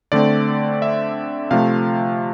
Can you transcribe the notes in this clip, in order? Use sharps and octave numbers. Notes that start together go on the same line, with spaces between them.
D3 A3 C4 D5
E5
C3 F3 A3 F5